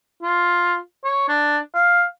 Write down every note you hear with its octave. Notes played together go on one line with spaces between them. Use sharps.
F4
C#5
D4
F5